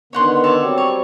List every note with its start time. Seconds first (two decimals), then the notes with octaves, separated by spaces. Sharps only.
0.13 D3 D#3 B3 C#5 F#5 C6
0.44 A4 C#5 D5
0.60 F#3 G3 C4
0.78 C#5